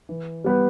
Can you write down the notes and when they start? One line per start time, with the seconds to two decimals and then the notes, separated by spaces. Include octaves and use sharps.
0.09 E3
0.44 G3 B3 G4 B4